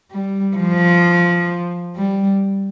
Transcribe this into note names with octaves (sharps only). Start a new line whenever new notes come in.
G3
F3
G3